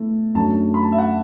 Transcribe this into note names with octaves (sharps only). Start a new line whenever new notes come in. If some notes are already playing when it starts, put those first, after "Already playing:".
Already playing: B2 A3 E4
F#2 F#3 A3 D4 A5
B5
A5
E5
F#5